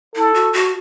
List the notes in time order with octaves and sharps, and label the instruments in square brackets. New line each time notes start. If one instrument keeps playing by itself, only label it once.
[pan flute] E4 [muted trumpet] A4
[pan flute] F#4
F#4